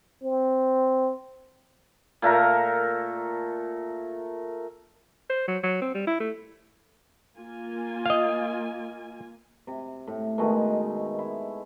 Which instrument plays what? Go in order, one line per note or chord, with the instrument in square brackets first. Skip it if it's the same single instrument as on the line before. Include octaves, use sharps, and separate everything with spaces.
[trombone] C4
[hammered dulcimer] A#2 A3 A#4 A#5
[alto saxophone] C5
F#3
F#3
C4
G3
E4
A3
[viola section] A#3 F4 G#5
[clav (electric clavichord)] D#5 F5
[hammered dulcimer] C3
A2
B2 D#3 G#3 A3
E4